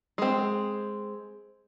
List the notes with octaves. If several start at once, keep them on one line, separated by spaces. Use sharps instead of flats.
G#3 C4